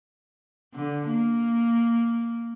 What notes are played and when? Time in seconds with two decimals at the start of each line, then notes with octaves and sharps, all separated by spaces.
0.74 D3
1.07 A#3